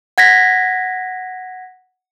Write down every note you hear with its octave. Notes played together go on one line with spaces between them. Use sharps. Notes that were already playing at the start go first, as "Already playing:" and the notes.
F#5 G#6 A#6 B6